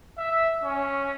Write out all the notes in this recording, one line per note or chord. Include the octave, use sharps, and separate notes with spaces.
E5
C#4